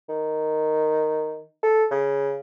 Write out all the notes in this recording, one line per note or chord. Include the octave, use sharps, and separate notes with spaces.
D#3
A4
C#3